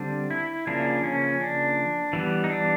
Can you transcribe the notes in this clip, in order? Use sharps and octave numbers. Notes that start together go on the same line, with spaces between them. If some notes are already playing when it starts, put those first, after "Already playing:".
Already playing: D3 G3 C4 D4
E4
C#3 F3 A#3 D4
C#4
D4
E3 G3 B3
D#4
D4